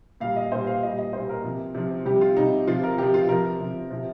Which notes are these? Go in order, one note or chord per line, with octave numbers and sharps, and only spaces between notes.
A#2 G3 F5
D#5
A#2 G3 C5
F5
A#2 G3 D#5
D#5
A#2 G3 C5
A#4
C3 F3
C3 F3
C3 G3 G4
F4
C3 G3 D#4
C3 F3 F4
A#4
C3 F3 G4
F4
C3 F3 A#4
C3 F3
C3 F3